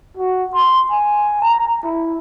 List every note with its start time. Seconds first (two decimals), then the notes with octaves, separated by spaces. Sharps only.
0.17 F#4
0.55 C6
0.91 G#5
1.42 A#5
1.84 E4